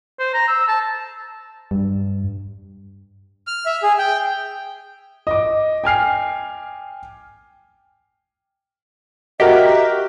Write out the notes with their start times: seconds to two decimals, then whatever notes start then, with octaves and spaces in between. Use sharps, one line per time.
0.20 C5
0.34 A#5
0.48 E6
0.68 A5
1.71 G2
3.47 F6
3.66 E5
3.83 G#4
3.99 G5
5.27 D#5 D6
5.84 G5 G#5 F6 C7
9.40 F#4 G4 A#4 D#5 E5